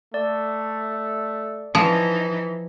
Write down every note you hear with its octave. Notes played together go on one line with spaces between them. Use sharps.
A3 D5
E3 F3 D#4